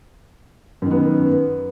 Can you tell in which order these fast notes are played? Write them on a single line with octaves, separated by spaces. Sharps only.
F#2 D#3 B3